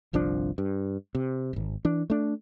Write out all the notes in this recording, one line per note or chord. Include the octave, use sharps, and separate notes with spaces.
G1 C2 F3 D4
G2
C3
D#1 G#1
E3 D4
A3 D4